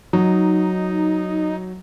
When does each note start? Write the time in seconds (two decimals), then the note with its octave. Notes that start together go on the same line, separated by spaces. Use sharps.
0.13 F#3 D#4